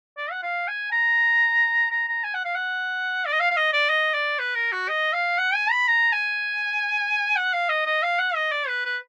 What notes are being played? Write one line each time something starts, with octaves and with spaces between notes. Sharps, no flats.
D5
F#5
F5
G#5
A#5
A#5
A#5
G#5
F#5
F5
F#5
D5
D#5
F5
F5
D#5
D5
D#5
D5
B4
A#4
F#4
D#5
F5
F#5
G#5
B5
A#5
G#5
F#5
F5
D#5
D#5
F5
F#5
D#5
D5
B4
B4